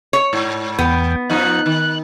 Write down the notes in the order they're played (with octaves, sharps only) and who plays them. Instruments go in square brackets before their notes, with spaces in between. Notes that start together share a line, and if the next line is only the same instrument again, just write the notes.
[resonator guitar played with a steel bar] C#5
[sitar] G#2
[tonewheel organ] E2 G5 [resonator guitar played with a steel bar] B3
[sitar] F2 F3 D#4 [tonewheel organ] F#6
[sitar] D#3